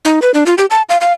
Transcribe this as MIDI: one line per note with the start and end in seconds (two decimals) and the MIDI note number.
0.05 0.20 63
0.22 0.31 71
0.34 0.44 62
0.46 0.54 65
0.58 0.66 67
0.70 0.82 81
0.89 0.98 77
1.01 1.13 77